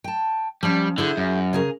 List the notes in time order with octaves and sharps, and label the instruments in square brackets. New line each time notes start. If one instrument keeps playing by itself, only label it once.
[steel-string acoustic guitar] G5 A5
[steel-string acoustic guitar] F3 C#4 [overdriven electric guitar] G3
[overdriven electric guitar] D3 [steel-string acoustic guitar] E4 G#4 C5
[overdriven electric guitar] F#2
[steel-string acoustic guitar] C#3 G#4 A#4